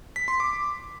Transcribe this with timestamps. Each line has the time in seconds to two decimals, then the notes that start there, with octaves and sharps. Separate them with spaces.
0.16 B6
0.28 C6
0.40 D6